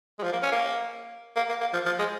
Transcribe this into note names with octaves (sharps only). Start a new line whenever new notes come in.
G#3
F3
A#3
C#4
A#3
A#3
A#3
A#3
F3
F3
G#3